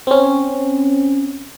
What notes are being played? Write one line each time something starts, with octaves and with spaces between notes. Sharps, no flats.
C4 C#4